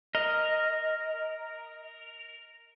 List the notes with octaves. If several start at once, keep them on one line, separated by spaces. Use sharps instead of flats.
A#4 D#5